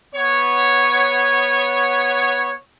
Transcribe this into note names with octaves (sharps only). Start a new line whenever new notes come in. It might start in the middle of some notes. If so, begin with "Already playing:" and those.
B3 C#5